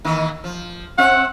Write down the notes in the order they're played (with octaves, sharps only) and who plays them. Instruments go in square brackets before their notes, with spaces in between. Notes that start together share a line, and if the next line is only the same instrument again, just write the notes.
[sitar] D#3 E3 A#3
F3
[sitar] C4 E5 [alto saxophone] F#5